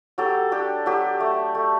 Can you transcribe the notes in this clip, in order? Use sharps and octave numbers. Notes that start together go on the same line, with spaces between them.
F#3 G4 A4
D4 G4 A4
F#3 G4 A4
A3
A3